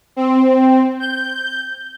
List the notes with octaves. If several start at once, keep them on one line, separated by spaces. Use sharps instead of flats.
C4
G6